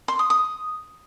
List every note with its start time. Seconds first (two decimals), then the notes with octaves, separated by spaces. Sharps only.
0.08 C6
0.19 D#6
0.30 D#6